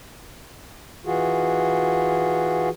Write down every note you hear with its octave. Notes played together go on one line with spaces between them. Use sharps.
E3 F4 F#4 G#4